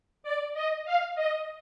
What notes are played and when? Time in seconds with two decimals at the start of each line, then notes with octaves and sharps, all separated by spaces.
0.23 D5
0.54 D#5
0.85 F5
1.16 D#5